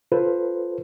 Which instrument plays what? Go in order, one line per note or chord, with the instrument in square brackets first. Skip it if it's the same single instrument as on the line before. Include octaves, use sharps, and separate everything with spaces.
[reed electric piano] F4 A4 B4 C5